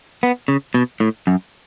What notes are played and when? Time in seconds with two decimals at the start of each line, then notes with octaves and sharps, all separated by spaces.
0.23 B3
0.48 C#3
0.74 B2
1.00 A2
1.27 F#2